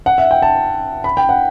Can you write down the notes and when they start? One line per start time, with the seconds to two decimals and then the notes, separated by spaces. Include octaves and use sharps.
0.06 F#5
0.18 E5
0.31 G5
0.42 A5
1.04 B5
1.17 G5
1.29 F#5